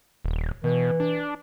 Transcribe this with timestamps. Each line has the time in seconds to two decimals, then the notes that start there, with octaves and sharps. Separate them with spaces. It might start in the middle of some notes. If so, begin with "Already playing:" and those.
0.25 D#1
0.64 B2 E3
1.00 D4